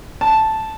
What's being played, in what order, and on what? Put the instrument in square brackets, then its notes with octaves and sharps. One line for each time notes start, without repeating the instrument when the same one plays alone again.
[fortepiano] A5